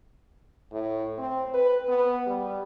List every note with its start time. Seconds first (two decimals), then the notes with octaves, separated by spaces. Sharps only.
0.72 A2
1.18 C4
1.54 B4
1.88 B3
2.27 G3